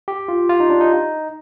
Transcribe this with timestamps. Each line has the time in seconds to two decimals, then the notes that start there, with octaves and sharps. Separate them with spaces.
0.08 G4
0.28 F4
0.49 F4
0.60 D#4
0.70 D4
0.81 D#4